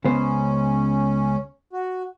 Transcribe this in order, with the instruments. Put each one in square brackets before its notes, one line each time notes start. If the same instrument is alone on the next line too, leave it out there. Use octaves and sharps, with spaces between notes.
[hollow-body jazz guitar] C#2 B3 C5 [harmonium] C#4
[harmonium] F#4